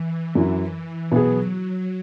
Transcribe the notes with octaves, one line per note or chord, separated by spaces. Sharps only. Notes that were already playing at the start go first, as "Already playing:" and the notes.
Already playing: E3
F#2 F#3 E4
B2 F#3 B3 G#4